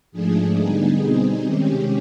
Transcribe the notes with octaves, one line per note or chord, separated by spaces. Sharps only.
G#2 F3 A3 D4 G#4
D3 G3 B3 D#4
B2 G3 C4 D#4 G#4
C3 D#3 G#3 C#4 G4